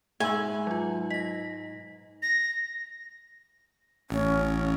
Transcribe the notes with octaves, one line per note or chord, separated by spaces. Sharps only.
G#2 G#4 E5 G#5 B5 E6 F#7
F#3 F4
D#5 A#6 B6
A#6
A1 C#4